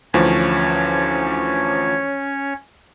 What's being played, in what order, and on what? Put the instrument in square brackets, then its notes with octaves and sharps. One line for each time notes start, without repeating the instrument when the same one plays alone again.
[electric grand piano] D2 E3 F3 [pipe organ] C#4 C#5